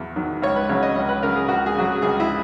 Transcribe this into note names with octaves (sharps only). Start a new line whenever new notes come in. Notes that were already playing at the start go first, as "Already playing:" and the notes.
Already playing: E2 F#3
D#3 F#3
C#2 C#5
B4
C#3 F#3 C#5
D#5
C#2
B4
C#3 F#3 A#4
G#4
C#2 F#4
G#4
C#3 F#3 F#4
G#4
C#2 G#4
E4